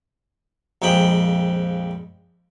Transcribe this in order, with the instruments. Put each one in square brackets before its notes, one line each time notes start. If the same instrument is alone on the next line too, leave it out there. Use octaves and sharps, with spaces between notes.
[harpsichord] A#1 F2 G#3 G5 B5